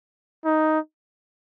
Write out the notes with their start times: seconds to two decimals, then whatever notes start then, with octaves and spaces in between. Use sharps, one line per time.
0.45 D#4